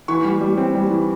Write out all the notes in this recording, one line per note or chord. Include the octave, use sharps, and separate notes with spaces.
E3 C#6
G3
G3
C4
G3
E3